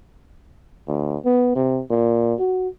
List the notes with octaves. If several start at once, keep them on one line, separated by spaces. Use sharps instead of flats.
D2
B3
C3
A#2
F#4